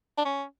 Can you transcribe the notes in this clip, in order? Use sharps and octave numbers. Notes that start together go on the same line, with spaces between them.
D4
C#4